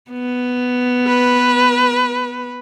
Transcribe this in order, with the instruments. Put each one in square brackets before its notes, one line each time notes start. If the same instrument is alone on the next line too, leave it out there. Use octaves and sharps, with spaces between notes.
[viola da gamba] B3
[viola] B4